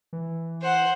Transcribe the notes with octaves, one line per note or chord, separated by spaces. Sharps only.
E3
C5 F#5